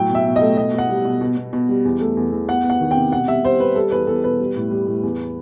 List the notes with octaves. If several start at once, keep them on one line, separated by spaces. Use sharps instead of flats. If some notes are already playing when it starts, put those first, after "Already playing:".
Already playing: A2 F#3 G5
B2
E5
B2
D#5
A3
B2 D#5
B2 F#5
G3
B2
B2
B2
B2
G3
E2
A3
E2
E2
B3 F#5
B3
F#5
D#3
G5
C3
B2 F#5
G3 E5
G3 C5
G3 B4
G3 A4
E2 B4
E2 A4
B2 B4
G3
A2
G3
A2
E2